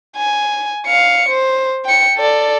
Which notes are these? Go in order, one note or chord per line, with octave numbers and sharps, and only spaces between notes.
G#5
F5 C#7
C5
G5 C#7
A4 D5